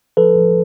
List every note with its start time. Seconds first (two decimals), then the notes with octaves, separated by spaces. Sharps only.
0.17 F3 A4 B4
0.38 F3